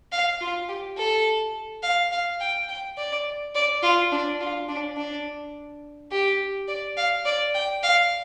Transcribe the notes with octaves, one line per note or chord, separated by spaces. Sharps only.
F5
F4
G4
A4
F5
F5
G5
G5
D5
D5
F4
D4
F4
D4
D4
G4
D5
F5
D5
G5
F5